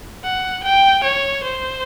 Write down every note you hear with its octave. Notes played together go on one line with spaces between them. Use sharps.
F#5
G5
C#5
C5